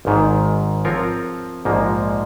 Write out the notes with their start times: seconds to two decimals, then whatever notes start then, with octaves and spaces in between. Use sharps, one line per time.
0.05 G#1 G#2 D#3
0.85 F3 C4 F4 A#4 C#5
1.65 A#1 G#2 F3 A#3